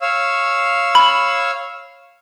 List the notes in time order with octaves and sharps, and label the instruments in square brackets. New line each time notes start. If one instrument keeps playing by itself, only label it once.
[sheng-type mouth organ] C#5 F5 E6
[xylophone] B5